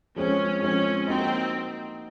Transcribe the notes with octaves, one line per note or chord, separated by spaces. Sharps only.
F3 G#3 C4 C#4
F3 G#3 C4 C#4
A#3 C4 D#4 F#4